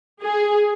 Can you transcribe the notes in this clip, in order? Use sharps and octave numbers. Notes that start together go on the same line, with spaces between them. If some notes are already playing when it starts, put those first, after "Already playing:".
G#4